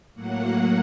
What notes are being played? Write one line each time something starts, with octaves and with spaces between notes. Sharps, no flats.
A2 F#3 A#3 F#5